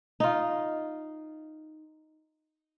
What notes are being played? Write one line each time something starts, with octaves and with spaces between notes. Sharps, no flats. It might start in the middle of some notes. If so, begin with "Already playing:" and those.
D#4 F4